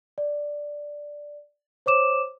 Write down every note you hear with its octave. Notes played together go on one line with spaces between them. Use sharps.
D5
C5 C#5 D6 E7